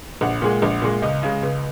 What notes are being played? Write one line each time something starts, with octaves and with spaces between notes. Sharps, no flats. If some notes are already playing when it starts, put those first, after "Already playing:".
A#1 F#5
A#2 G#3
A#1
A#2 G#3
C#2 D#5
C#3 G#3
C#2